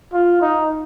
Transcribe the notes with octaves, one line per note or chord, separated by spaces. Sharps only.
F4
D#4